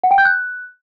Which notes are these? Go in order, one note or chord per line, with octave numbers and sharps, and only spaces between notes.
F#5
G5
G6
F#6